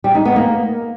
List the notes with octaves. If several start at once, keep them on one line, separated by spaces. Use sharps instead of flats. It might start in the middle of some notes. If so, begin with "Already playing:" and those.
G3
D#4
B3
A#3